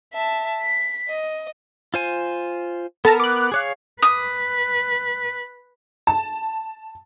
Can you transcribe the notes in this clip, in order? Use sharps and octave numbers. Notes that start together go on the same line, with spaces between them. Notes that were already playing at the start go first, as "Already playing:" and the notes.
E5 A5
B6
D#5
F4 C5 G#5
B3 A4 A#4 A5 A#5
D6 F#6
G#4 C#5 F5
B4 D#6
A5